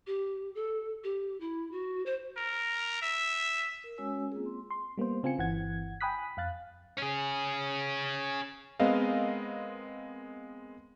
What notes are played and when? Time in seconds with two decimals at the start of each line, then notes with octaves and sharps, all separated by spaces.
0.07 G4
0.55 A4
1.04 G4
1.40 E4
1.72 F#4
2.06 C5
2.37 A#4
3.02 E5
3.84 A#4
3.98 G#3 C#4 F#4 C#5 G#5 E6
4.32 A#3 C4 F4 G#4
4.46 C6
4.70 C6
4.98 G3 A#3 B3 C5
5.23 C#3 C4 F4 G#5 C#7
5.38 G1 E3 F#5 G#6
6.01 G5 G#5 B5 D#6 F#6 B6
6.37 F2 F5 F#6 A6
6.97 C#4 G#4
8.80 G#3 B3 C4 A#4 D#5 F5